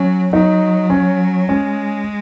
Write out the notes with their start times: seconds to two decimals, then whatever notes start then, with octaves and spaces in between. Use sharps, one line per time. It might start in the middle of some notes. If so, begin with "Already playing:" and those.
Already playing: F#3 C#4
0.32 F#3 D#4
0.90 C#4
1.49 G#3 C#4